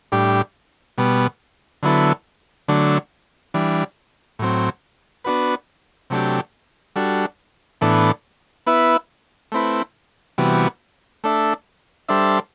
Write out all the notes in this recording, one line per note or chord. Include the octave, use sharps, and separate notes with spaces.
A2 G3 D4 G4
B2 G3 B3
D3 F#3 B3 E4 A4
D3 F#3 A3 D4
E3 G3 D4
A2 F#3 C4
B3 D4 F#4 B4
C3 F#3 A3 D4 G4
G3 D4 F#4 A4
A2 E3 B3 D4 A4
B3 E4 B4 E5
A3 C4 E4 B4
C3 E3 G3 B3 F#4
A3 D4 A4 E5
G3 D4 A4 C5 E5